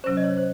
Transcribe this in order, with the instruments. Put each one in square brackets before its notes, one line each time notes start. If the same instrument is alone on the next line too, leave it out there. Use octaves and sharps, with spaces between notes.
[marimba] C3 F#3 C#4 [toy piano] C5
[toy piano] D#5
C#5
C5